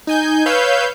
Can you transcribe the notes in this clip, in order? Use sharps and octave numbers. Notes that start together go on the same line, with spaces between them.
D#4 G#5 G6
B4 C#5 F5 E6 G6